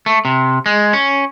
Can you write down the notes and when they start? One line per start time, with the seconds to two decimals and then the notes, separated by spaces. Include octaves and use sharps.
0.06 A3
0.25 C3
0.66 G#3
0.93 C#4